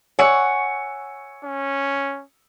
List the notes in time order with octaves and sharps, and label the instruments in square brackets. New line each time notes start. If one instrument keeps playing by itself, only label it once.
[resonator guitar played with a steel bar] C#5 F#5 [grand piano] G#5 E6 C#7
[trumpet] C#4